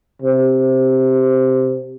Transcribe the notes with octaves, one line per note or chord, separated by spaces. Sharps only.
C3